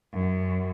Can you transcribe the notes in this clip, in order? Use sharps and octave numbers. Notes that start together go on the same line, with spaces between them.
F#2